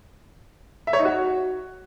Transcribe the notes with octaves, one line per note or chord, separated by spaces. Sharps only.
E5
C#5
D#4
F#4